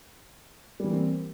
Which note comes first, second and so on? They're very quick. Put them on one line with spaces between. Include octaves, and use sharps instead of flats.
G3 E3 A#3 C4